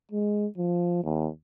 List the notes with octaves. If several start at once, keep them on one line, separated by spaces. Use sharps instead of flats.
G#3
F3
D#2